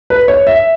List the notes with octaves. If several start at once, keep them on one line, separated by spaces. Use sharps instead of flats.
B4
C#5
E5